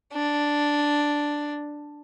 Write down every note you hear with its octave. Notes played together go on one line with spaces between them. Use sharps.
D4